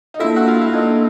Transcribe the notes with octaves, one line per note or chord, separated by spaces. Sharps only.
D#4
A#3 D4 E4 F4 A4
F#4
F4
E4
A#3 D4 D#4 F4 A4